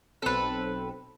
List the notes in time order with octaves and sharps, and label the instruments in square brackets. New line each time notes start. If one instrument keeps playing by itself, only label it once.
[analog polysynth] B1 C4 [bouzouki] A4 B4